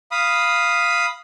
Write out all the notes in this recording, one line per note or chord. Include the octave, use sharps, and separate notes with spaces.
F5 B5 D#6